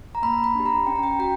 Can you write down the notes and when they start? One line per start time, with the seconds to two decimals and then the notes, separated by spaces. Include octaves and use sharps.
0.15 A#5
0.23 A#3 B5
0.44 B5
0.55 D4 G4
0.66 A#5
0.87 C#4 G5
0.96 A#5
1.03 G5
1.19 F#4 G5